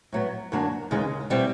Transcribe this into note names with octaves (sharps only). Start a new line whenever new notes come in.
A2 F#3 B3
F#2 D3 F#3 A#3 D4
D#2 C#3 E3 G#3
B2 G3 C4 E4